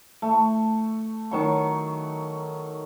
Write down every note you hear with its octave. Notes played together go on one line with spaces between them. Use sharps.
A3
D#3 F#3 C#6